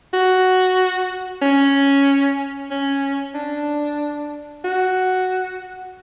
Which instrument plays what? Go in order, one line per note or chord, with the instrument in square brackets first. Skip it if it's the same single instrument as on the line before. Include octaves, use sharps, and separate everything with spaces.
[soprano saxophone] F#4
C#4
C#4
D4
F#4